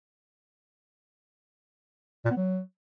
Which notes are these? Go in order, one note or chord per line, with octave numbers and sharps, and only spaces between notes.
A#2
B3
F#3